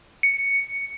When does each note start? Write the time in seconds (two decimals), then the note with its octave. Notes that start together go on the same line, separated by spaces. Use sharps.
0.23 C#7